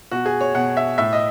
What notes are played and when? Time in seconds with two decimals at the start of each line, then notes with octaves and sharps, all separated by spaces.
0.11 B2 F#4
0.26 G#4
0.41 C#5
0.55 B2 F#5
0.77 E5
0.98 A2 E5
1.13 D#5